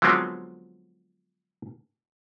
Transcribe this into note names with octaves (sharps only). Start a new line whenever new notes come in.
D3 F3 F#3 G#3 B3 C4